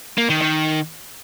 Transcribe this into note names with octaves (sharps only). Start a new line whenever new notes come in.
A#3
D#3
D#3